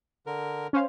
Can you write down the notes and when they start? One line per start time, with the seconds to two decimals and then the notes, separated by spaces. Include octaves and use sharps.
0.26 D3 A#4
0.73 C#4 C5 F5